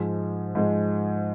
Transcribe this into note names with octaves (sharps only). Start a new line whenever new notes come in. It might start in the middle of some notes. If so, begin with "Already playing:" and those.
Already playing: G#2 F3 G#3
G#2 F3 G#3